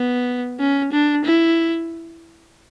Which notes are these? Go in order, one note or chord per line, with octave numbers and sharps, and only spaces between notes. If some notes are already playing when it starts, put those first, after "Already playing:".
Already playing: B3
C#4
D4
E4